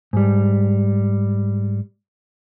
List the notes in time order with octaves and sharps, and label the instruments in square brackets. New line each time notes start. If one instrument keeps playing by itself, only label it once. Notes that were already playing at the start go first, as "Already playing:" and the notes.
[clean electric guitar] G#2 G3